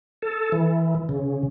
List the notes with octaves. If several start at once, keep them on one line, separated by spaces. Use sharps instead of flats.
A4
E3
C#3